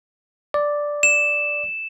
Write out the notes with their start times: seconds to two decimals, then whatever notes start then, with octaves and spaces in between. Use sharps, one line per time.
0.54 D5
1.03 E7